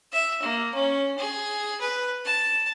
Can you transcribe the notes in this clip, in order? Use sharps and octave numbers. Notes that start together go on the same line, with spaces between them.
E5
A#3
C#4
G#4
B4
A5